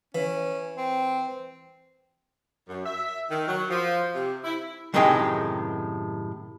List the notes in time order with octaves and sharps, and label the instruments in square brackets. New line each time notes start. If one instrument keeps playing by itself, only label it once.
[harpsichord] E3 [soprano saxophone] C#4
[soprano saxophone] C4
[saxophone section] F#2
E5
D#3
F#3
F3
C3
E4
[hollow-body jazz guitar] F#2 A2 C3 D#3 G#3 G5